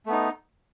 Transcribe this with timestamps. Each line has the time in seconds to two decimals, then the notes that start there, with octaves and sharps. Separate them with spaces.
0.06 A3
0.09 B3
0.13 D#4